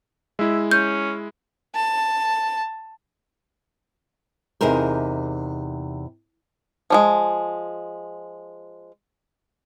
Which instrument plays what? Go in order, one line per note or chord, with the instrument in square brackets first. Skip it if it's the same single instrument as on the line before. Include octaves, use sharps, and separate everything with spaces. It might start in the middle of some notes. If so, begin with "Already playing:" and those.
[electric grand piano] G#3 E4 [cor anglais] E5
[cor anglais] C#4 [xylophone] G6
[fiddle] A5
[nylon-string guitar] E2 C3 D#4 G#4 A#4 C5
[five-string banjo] F3 G3 G#3